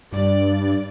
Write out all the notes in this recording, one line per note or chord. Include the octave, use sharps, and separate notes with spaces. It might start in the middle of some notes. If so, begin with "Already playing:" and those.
G2 D5